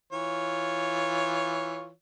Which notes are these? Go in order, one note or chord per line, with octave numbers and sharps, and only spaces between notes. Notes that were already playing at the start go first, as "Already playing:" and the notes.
E3 F4 C#5